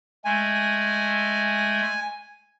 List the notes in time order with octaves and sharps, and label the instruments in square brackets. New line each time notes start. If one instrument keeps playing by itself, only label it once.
[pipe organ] G#3 A3 [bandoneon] G#5